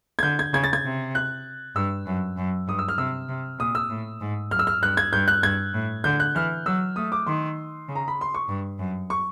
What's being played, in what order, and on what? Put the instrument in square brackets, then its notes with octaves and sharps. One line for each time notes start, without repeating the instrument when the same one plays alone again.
[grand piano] G#6
[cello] D3 [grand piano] G6
[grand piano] G#6
[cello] C#3 [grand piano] G#6
[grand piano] A6
G#6
[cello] C3
[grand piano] F#6
[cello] G2 [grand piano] E6
[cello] F#2
F#2
[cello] G2 [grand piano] D#6
[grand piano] E6
F6
[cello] C3 [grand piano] E6
[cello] C3
[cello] A#2 [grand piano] D#6
[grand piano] E6
[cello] A2
G#2
[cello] F#2 [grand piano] F6
[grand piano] E6
F6
[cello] G2 [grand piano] F#6
[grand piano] G#6
[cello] G2 [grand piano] G6
[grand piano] F#6
[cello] G2 [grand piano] G#6
[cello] A2
[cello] D3 [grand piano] G6
[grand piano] F#6
[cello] E3 [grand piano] F6
[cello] F#3 [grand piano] E6
[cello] A3 [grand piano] D#6
[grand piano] D6
[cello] D#3 [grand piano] C6
[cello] C#3
[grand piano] A#5
B5
C6
C#6
[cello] G2
F#2
[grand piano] C#6